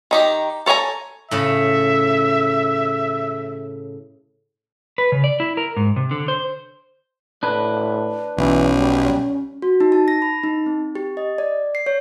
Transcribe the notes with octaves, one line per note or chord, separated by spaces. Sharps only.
D#3 D#4 G4
A4 C#5 D#5 G#5 A#5
A2 C#3 E5
B4
C#3
D5
E4
A#4
G#2
C3
D3
C5
A2 D4 B4
B1 E3 C#4
G3
F#4
D#4
A5
A#6
B5
D#4
C4
G4
D#5
D5
C7
C#5